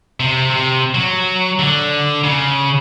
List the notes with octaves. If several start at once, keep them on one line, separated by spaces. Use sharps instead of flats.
C3
C3
F#3
D3
C#3